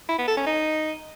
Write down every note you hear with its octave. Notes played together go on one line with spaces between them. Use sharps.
E4
B3
A4
C#4
D#4